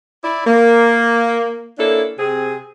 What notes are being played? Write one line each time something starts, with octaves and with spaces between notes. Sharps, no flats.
E4 D5
A#3
A#3 C#4 D4 E4 A4
C3 C4 G#4